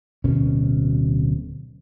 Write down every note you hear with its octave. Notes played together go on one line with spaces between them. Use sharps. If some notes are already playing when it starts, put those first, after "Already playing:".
D1 B2 C#4